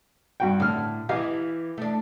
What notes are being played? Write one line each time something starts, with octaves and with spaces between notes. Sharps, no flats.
G2 F#4 G5
A2 D3 F6
E3 G4 D#5 F5
A3 D4